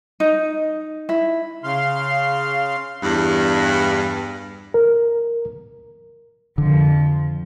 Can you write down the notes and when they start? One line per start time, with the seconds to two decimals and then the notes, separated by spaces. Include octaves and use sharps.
0.20 D#4
1.09 E4
1.64 C#3 F5 C6
3.03 E2 G2
4.74 A#4
6.58 F2 D3 F3